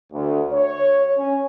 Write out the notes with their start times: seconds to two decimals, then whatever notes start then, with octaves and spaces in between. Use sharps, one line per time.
0.13 D2
0.53 C#5
1.18 C#4